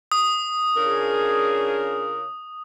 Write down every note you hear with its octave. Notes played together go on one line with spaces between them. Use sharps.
D#6
C#3 C#4 D4 F4 G#4 A#4